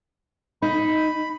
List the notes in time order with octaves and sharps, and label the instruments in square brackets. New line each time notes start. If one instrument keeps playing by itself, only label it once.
[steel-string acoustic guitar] D#4 [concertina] B5